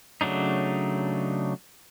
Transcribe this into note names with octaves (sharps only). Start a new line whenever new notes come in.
C#3 F#3 A3 D4 D#4